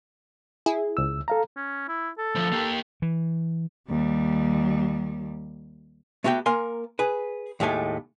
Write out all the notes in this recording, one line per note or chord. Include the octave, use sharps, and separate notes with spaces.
E4 G#4
C#2 E6
A4 F5 A#5
C#4
E4
A4
D2 F3
A#3 G4
E3
D#2 G3
A3 B3 F#4 G4 G5
A#3 A#4 G#5 C6
G#4 B4
D#2 A2 G#3 A3 G#5